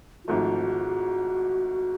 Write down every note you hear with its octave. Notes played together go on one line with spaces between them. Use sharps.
F4
G#1 G#2 F3 A3 F#4